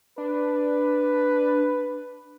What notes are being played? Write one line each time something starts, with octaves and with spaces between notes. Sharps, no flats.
D4 B4